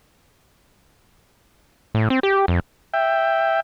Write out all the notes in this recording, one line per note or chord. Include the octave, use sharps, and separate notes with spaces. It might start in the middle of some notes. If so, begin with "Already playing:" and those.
A2
C4
G4
F2
E5 G5